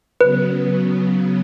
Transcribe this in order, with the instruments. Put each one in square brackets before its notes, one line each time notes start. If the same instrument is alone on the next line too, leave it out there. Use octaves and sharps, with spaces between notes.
[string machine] C#3 F#3 B3 [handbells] B4